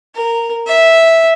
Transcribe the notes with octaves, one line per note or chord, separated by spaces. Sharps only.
A#4
E5